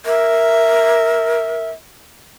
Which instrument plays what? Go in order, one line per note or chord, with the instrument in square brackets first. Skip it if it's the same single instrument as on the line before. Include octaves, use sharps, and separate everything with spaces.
[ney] A#4 [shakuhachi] E5